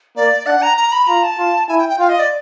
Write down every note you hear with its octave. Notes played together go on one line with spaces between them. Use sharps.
A#3 D5
D4 F#5
A#5
A#5
B5
F4 A#5
A5
F4
E4 G#5
G5
G5
F4 F5
D#5
D5